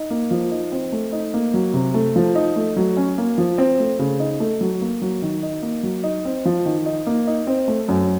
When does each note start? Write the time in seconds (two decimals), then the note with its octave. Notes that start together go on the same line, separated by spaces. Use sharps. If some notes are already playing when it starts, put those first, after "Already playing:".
Already playing: D#4
0.10 A#3
0.31 F3
0.51 D#4
0.72 C4
0.92 A3
1.12 D#4
1.34 A#3
1.54 F#3
1.74 C3
1.94 A3
2.16 F3
2.35 D#4
2.56 A3
2.76 F#3
2.97 C#4
3.18 A#3
3.38 F3
3.58 C4
3.79 A3
3.99 C#3
4.20 D#4
4.40 A3
4.61 F#3
4.81 A#3
5.02 F#3
5.22 D#3
5.43 D#4
5.62 A#3
5.83 F#3
6.03 D#4
6.25 C4
6.45 F3
6.66 D#3
6.86 D#4
7.07 A#3
7.27 D#4
7.47 C4
7.68 A3
7.88 F#2